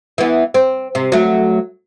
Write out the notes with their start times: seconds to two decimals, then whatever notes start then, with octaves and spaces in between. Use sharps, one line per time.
0.18 E3 B3
0.54 C4
0.95 C3
1.12 F#3 A3